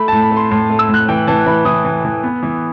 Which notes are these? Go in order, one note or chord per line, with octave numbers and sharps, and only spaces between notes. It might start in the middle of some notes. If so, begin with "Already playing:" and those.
Already playing: A3 B5
A2 A5
B5
A3
C6
A2 C6
A3
E6
A2
F#6
E3 G5
E3 A5
E3 B5
E3 D#6
E3
E3
B3
E3